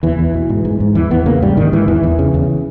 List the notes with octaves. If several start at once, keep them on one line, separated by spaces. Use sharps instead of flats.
E2 E3
E2
B2
G#2
G#2
G#2
E2 E3
E2 B3
C#3 A#3
G#2 G3
G#2 D#3
G#2 E3
E2 E3
E2
C#3
E2